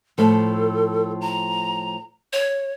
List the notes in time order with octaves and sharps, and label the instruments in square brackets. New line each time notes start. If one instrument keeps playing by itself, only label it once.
[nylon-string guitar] A2 F3 [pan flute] A4
[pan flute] A#5
C#5